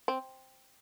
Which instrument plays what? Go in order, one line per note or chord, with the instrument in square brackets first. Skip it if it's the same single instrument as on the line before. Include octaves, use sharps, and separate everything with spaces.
[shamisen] C4